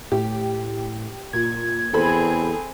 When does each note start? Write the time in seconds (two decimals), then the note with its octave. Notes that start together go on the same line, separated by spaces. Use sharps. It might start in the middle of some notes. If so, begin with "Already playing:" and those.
0.12 A2 G4
1.33 A#2 G#6
1.93 E2 C4 G#4 A4 C5 B5